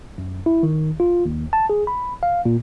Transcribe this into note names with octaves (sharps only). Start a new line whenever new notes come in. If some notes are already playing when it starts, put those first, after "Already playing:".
F#2
E4
D#3
F4
D#2
A5
G#4
B5
F5
A#2